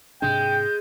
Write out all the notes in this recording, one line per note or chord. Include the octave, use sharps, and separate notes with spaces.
G#2 C3 G#3 D4 G5 G6